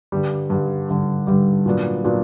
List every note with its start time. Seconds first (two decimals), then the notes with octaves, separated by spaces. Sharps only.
0.12 G2 D3 G3
0.50 G2 D3 G3
0.89 G2 D3 G3
1.27 G2 D3 G3
1.66 A#2 F#3 B3 D4
2.04 A#2 F#3 B3 D4